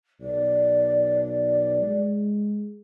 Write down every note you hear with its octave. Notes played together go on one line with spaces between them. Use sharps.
B1 D5
G#3